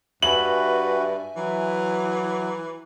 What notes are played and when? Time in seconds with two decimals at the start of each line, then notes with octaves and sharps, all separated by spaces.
0.23 G2 F#4 B4 E5 G#5 F#7
1.36 E3 F#3